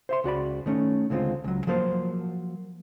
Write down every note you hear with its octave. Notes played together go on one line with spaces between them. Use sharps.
C5 E5 C6
C#2 F#4 D5 B5
D#3 A3 C#4
C#2 D3 G#3 C4 F4
C#2 F#3
F3 F#3 A#3 C5 A5